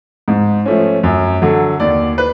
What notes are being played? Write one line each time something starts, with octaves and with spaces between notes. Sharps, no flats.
G#2
F3 A3 C#4
F#2
D3 F#3
D#2 D5
B4